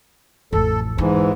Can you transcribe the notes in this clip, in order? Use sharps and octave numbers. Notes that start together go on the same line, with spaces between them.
A1 F2 A4
E2 G#2 D3 E3